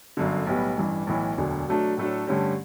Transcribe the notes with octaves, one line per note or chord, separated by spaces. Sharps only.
G1 F#2 D3
B1 A2 G3 B3
A1 G2 E3
B1 A2 E3
E1 D2 D3 F#3
B2 F#3 A3 D4
A2 F#3 A3 D4 A4
G2 D3 A3 C#4 G4